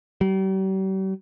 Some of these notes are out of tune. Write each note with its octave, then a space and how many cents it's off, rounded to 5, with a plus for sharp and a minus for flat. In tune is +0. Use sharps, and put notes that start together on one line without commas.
G3 -45